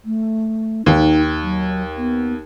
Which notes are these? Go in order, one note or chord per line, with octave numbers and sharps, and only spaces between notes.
A3
D#2 D#4
F#3
B3